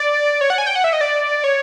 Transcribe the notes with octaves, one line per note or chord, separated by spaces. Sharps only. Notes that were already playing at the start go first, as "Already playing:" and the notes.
Already playing: D5
C#5
F#5
G#5
G5
F#5
E5
D#5
D5
C#5